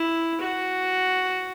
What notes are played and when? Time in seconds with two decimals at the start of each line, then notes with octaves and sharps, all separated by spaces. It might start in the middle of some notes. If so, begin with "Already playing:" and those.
Already playing: E4
0.41 F#4